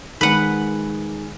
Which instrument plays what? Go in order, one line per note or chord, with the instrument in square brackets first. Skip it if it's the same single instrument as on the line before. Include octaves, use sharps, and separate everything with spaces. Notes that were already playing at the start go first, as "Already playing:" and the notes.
[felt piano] D#3 G#3 [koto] B4 F#5